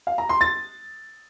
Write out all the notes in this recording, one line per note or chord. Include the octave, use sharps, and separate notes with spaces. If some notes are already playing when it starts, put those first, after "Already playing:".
F5
A#5
C6
A6